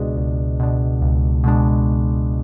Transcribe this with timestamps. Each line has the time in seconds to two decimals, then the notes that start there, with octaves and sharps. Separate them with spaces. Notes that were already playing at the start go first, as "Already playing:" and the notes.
Already playing: C#2 B2 G#3 D4
0.17 C#2
0.60 B2 G#3 D4
1.01 C#2
1.44 B2 G#3 D4